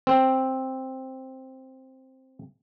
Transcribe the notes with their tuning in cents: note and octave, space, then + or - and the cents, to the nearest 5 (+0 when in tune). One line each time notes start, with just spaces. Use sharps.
C4 +5